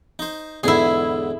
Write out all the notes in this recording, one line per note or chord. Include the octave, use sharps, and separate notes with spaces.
D#4 C5
E2 G#2 D3 E4 G#4